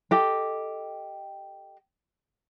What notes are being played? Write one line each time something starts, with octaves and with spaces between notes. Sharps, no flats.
G4 A4 D#5 G5